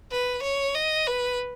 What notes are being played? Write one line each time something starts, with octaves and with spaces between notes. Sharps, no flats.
B4
C#5
D#5
B4